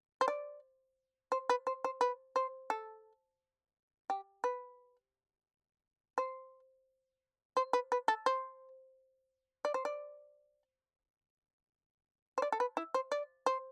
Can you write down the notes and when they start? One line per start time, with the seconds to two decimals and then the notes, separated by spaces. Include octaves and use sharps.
0.21 C5
0.28 D5
1.32 C5
1.49 B4
1.67 C5
1.84 C5
2.01 B4
2.36 C5
2.70 A4
4.10 G4
4.44 B4
6.18 C5
7.57 C5
7.73 B4
7.92 B4
8.08 A4
8.26 C5
9.65 D5
9.74 C5
9.85 D5
12.38 C5
12.42 D5
12.52 A4
12.60 B4
12.77 E4
12.94 C5
13.12 D5
13.46 C5